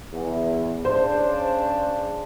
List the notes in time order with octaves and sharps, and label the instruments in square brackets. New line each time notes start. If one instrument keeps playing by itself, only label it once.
[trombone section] E2
[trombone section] C#3 D4 [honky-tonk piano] C5